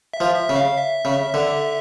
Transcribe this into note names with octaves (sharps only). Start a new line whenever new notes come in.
E5
F3
E5
C#3
F5
E5
C#3
D3